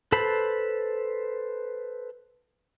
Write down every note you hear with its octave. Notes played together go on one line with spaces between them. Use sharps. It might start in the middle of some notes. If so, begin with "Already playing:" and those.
A4 B4 C5 A5 B5